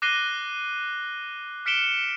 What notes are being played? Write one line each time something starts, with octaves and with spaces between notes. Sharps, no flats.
D6 F#6 A#6 C7 D#7 G7
F6 B6 C#7 D7 E7 G7